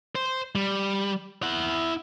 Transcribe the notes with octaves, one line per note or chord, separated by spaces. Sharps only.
C5
G3
E4 F#5